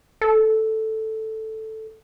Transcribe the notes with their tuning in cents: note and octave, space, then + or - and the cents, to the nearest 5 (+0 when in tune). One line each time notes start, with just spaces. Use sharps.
A4 +0